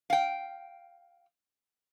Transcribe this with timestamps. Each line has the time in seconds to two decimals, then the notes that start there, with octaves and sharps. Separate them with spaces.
0.10 F5 G5